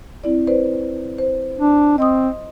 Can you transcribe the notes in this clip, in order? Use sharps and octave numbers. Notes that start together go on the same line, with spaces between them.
C4 E4 D5
B4 C5 D5
C5
D4
C4 D#5 C6 D#6